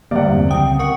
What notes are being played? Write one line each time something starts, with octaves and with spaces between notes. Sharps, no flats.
D3 F#3 G3 A#3 D5 E5 F#5
E2 G2 C3
C#2 C4 G5 D#6
A#4 F#5 C#6 D#6